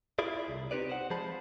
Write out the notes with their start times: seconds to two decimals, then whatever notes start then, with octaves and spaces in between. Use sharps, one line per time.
0.19 E4 F4 G#4 D5
0.48 C2
0.71 C4 D#4 G4 B4 D5
0.89 C5 F#5
1.10 F3 G#3 G#4 C5 A5 B5